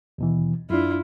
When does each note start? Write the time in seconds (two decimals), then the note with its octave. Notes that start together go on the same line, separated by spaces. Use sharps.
0.18 D#2 B2 E3
0.70 F#2 D4 E4 F4